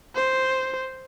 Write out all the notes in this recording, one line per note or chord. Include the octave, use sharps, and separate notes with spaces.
C5